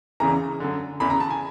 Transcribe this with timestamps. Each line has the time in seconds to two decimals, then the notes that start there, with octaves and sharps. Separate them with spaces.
0.20 E2 C#3 E3 A#5
0.60 F#2 D3
1.00 E2 C#3 E3 B5
1.10 A#5
1.20 A5
1.30 G#5